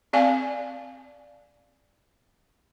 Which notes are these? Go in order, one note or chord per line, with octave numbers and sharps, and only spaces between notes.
C4 D5 F5 G#5